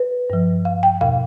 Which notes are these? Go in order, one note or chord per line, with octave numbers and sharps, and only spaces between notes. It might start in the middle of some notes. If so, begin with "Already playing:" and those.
Already playing: B4
G2 F3
F5
G5
E2 B2 F5